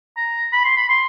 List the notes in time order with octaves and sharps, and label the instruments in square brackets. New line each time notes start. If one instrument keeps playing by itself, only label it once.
[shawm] A#5
B5
C6
B5
C6